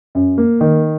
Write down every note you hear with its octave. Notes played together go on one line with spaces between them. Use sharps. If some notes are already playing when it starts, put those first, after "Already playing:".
F#2
A#3
D#3